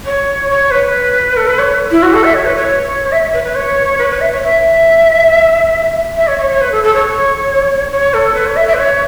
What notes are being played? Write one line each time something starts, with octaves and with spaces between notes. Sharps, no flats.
C#5
C#5
B4
A4
B4
C#5
E4
F#4
A4
E5
C#5
B4
C#5
E5
B4
B4
C#5
B4
B4
E5
C#5
E5
E5
C#5
C#5
C#5
B4
A4
A4
C#5
C#5
A4
B4
C#5
E5
E5
B4
C#5